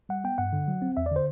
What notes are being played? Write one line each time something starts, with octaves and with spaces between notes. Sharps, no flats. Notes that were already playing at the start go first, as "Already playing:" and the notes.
G3 F#5
B3 G5
G2 F#5
D3
F#3
C4
E2 E5
D5
D3 C5